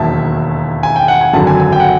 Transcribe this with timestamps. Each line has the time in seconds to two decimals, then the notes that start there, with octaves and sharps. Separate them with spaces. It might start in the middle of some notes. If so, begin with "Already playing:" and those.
Already playing: E1 D#2 D#3 F#3 E5 A5
0.83 G#5
0.96 G5
1.08 F#5
1.21 G#5
1.33 G#1 F#2 D3 F#3 A5
1.47 G#5
1.60 G#5
1.72 G5
1.80 F#5